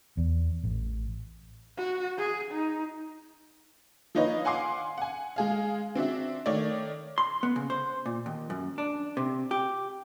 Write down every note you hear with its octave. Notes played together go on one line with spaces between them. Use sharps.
E2
A1
F#4
G#4
D#4
F3 A#3 D#4 B4 C#5 D#5
F5 F#5 G#5 C6 D6 C7
F#5 G#5
G#3 G#4 F5
C4 D4 F#4 E5
D#3 A3 C#5 D5
C6
B3
C#3
C5
A#2
D#2
F#2
D4
C3
G4